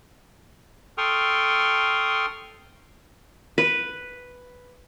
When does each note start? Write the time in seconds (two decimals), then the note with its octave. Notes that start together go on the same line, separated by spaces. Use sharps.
0.98 A4 G5 C6 C#6 D#6 F6
3.58 B4